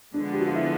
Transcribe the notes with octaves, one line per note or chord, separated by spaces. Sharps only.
D3 F3 G#3 B3 D4
G4
F#4
F4
E4